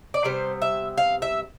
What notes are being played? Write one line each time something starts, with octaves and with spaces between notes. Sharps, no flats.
D5
C3 G3 B3 C5
E5
F5
E5